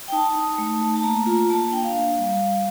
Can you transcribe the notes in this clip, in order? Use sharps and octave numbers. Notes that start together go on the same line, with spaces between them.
G5
D#4 A5
D#4
A3
A3
A5
A#3 A#5
F4 A#5
A#3 A5
D4 G5
F5
A#3
G3
G3